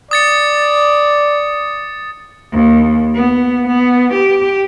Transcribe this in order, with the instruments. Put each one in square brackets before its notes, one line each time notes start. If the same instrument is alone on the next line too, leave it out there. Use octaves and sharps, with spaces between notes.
[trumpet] D5 [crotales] D#6 A6 C#7
[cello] D#2
B3
B3
G4